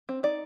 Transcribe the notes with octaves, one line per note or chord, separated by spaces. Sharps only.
C4
D#4 D5